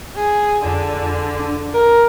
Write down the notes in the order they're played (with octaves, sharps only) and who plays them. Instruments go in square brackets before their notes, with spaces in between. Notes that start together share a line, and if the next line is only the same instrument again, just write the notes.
[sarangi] G#4
[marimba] F2 D5 [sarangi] D3
[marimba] F2
D4
[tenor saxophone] A#4